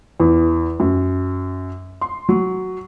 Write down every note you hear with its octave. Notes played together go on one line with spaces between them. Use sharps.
E2
F#2
C6
F#3